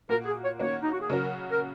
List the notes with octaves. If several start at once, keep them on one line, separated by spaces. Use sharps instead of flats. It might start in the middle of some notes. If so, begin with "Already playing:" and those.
A#2 A#3 F#4 A#4
G#4
C#5
D#3 A#3 C#4 F#4 C#5
D#4
F#4
G#4
C#3 F#3 C#4 F#4 A#4
A#4